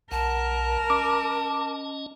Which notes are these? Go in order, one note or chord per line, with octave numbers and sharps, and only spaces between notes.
B1 A#4 F#5 A5
C#4 D#5 D6